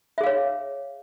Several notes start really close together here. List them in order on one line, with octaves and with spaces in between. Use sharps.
E5 G#4 F5 C#5